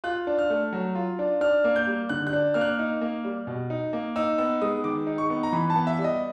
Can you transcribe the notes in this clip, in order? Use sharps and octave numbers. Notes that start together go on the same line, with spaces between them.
F4 F#6
D4
F6
A3
F#3
F4
D4
D4 F6
A#3
G6
G3
D3 F#6
F#6
D4
A#3 F6
F#6
D#4
A#3
G3
B2
D#4
A#3
D#4 E6
B3 E6
G#3 D#6
D#3 D6
D#4
C#6
B3
A#5
E3 B5
A5
B3
E5
G3
D#5